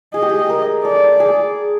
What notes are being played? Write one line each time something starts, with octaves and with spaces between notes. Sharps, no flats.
G#4 D#5
G4
G#4
A#4
A4 D5
G#4